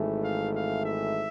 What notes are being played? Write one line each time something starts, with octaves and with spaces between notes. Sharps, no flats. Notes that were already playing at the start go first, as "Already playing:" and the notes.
Already playing: G#1 G#2 E3 A3
F5
F5
E5